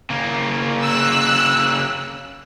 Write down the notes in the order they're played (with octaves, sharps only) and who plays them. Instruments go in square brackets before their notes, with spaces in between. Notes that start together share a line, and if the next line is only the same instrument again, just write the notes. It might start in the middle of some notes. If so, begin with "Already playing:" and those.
[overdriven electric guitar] C#3 A#3
[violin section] E6 F#6